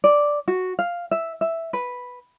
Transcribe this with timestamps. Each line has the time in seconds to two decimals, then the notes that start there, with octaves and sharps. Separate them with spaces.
0.04 D5
0.48 F#4
0.79 F5
1.11 E5
1.41 E5
1.73 B4